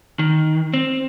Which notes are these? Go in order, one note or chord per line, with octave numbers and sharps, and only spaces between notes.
D#3
C4